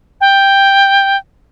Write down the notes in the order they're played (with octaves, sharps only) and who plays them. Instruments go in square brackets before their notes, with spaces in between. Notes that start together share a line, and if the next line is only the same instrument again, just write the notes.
[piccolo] G5